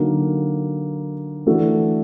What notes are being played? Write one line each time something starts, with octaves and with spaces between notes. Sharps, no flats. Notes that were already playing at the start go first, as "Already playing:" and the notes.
Already playing: D3 F#3 A#3 D#4
E3 A3 D4 F#4 A4